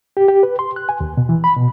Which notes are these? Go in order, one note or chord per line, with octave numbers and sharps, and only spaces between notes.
G4
G4
B4
C6
F#6
G#5
D#2
B2
E3
B5
B2